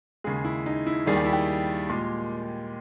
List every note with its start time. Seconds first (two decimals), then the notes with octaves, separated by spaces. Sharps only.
0.24 D#2 C#3 G#3 G#4
0.45 E4
0.66 D#4
0.87 E4
1.06 D#2 D#3 G3 G#4
1.16 G4
1.25 E4
1.33 G4
1.90 A#2 G#3